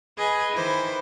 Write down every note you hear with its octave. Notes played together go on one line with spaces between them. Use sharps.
G#4 B4 D#5 G#5
D#3 E4 B4 C5 D6